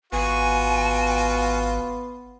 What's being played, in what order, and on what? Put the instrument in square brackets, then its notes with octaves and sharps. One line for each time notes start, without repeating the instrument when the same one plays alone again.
[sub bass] G#1 [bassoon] B3 [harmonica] F4 F#4 [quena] G#5